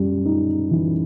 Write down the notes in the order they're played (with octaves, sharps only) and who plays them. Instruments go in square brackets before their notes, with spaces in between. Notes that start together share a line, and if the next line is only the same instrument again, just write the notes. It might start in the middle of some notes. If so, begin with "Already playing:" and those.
Already playing: [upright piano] F#2 G3
D#4
E3